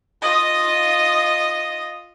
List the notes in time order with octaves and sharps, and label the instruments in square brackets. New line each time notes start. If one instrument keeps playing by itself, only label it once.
[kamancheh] F4 D#5